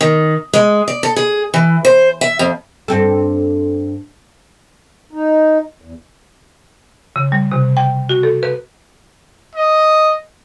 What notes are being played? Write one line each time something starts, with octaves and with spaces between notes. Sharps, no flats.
D#3
G#3
D5
A4
G#4
E3
C5
E5
F2
G2 C4 A4
D#4
E2
C#3
G3
C3
G5
F#4
A4
B4
D#5